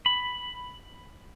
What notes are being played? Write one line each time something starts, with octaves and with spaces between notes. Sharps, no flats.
B5